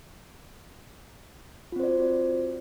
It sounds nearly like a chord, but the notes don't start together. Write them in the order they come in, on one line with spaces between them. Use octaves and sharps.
F4 C4 C5 D5 F#4